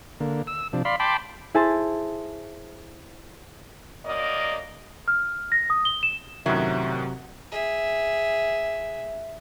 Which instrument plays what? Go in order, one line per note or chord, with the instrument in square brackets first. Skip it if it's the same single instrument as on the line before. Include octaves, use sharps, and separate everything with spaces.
[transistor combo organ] D3 A#3
E6
C3 F3 D4
D5 F5 B5 C6
G5 A5 B5 C6 D6
[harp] E4 G#4 C5 A5 C6
[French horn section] F#2 A#3 D5 D#5
[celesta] F6
A#6
D#6
G7
E7
[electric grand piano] F#2 A2 D#3 [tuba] C3 [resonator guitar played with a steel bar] F#3 [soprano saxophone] E5
[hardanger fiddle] G#4 E5